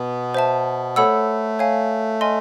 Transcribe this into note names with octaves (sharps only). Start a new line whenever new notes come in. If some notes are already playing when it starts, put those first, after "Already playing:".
Already playing: B2 B3
C5 E5 A5
A3 A4 C#5 F#5 B5 E6
C#5 F5 G#5
D#5 G#5 C6 F6